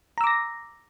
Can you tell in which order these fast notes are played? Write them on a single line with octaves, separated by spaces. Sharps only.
A#5 E6 D6 A#6